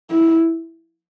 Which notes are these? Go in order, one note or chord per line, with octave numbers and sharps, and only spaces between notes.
E4